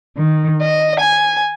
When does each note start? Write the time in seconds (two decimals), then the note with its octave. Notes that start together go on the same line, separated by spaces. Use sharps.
0.18 D#3
0.61 D#5
0.99 G#5